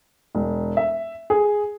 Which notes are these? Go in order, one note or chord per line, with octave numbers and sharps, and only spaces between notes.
E1
E5
G#4